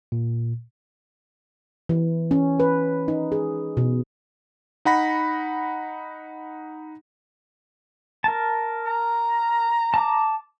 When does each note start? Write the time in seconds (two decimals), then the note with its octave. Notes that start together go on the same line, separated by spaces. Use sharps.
0.12 A#2
1.89 E3
2.31 C#4
2.60 B4
3.08 D#4
3.32 G#4
3.77 B2
4.85 D#4 F#5 B5 A#6
8.24 A#4 A5
8.86 A#5
9.94 A5 D6